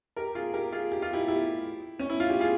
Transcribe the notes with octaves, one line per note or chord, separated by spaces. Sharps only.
G4 A#4
F4 G#4
G4 A#4
F4 G#4
G4
F4
E4 G4
E4 G4
C#4
E4
F4
G4
F4 G#4